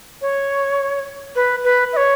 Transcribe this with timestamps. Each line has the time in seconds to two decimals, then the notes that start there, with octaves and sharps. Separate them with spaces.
0.22 C#5
1.36 B4
1.64 B4
1.93 E5
1.97 C#5